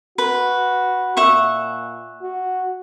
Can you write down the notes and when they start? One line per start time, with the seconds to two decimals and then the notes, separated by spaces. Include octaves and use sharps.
0.18 F#4 B4
1.17 A#2 E5 F#5 C#6
2.22 F#4